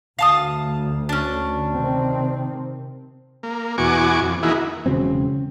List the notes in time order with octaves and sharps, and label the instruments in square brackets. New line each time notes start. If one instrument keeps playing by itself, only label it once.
[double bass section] D2 [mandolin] F5 A5 D#6
[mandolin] C#4 D4
[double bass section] C3 D#3 C4
[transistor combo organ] A#3
E2 B2 F#4 G#5 C#6 D6
F2
D#3 E3 A#3 E4 F#4 G#4
[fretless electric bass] E1 C#3 F#3 C4